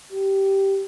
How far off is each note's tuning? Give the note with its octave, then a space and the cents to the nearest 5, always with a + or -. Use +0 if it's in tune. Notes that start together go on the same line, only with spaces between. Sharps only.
G4 -10